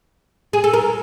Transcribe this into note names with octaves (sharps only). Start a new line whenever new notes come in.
G#4
A4
A#4